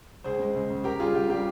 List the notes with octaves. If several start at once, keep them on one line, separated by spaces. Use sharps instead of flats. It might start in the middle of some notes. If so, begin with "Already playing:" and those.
C#2 G#4 C5
C#3 G#3
C#2
C#3 G#3
C#2 G4 A#4
C#3 G3 F4 G#4
C#2 G4
C#3 G3 G4